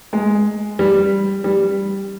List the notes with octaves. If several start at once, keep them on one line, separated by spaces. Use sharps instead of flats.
G#3
G3
G3